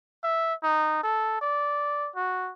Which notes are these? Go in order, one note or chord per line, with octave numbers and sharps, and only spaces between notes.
E5
D#4
A4
D5
F#4